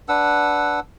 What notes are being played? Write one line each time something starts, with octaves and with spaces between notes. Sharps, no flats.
D4 B4 F#5 E6